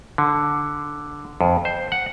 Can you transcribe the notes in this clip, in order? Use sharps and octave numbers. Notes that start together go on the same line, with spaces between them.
D3
F2
C5
F#5